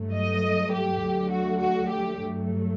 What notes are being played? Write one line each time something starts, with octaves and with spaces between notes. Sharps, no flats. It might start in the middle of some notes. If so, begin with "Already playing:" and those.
Already playing: G2 F#3 A3
D#5
G4
D2 D3 F#3 A3
F#4
F#4
G4
G2 F#3 A3